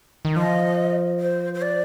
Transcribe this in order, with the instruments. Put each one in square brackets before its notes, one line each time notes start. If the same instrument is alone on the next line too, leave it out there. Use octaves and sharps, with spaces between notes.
[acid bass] D#3
[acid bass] F3 [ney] D#5
[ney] C5
C5
D5